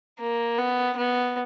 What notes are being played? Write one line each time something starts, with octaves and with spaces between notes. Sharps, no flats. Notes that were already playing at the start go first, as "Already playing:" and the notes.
A#3
B3
B3